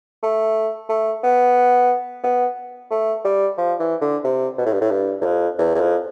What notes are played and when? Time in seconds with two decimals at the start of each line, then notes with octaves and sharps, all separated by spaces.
0.23 A3
0.89 A3
1.23 B3
2.24 B3
2.91 A3
3.25 G3
3.58 F3
3.79 E3
4.01 D3
4.24 C3
4.58 B2
4.66 A2
4.73 G2
4.81 A2
4.91 G2
5.21 E2
5.25 F2
5.58 E2
5.75 E2
5.80 F2